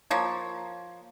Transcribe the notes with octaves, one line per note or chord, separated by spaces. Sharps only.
F3 A#3 C#5